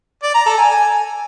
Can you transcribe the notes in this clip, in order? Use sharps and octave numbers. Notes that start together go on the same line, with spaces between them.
D5
A#5
A4
G#5
G#5